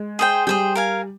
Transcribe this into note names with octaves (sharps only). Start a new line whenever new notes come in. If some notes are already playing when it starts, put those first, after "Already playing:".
Already playing: G#3
G#4 C5 G5
G3 G#4 C5 G5
A#4 F5 G#5